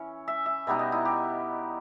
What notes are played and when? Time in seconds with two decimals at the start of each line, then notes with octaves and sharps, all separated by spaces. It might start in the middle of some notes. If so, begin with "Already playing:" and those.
Already playing: E3 C#4
0.28 E5
0.46 E5
0.67 B2 G3 B3 D#4 E5
0.79 D#5
0.92 E4
1.05 G4